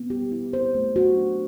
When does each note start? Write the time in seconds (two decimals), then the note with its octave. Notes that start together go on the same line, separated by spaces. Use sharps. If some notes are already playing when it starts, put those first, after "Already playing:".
Already playing: B3
0.10 G4
0.32 E4
0.53 C5
0.75 A3
0.96 F#4
1.17 D4